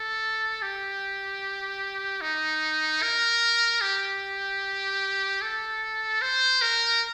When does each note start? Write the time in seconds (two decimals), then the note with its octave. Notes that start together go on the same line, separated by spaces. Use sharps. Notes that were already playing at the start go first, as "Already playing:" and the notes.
Already playing: A4
0.62 G4
2.21 D#4
3.02 A#4
3.81 G4
5.41 A4
6.22 C5
6.62 A#4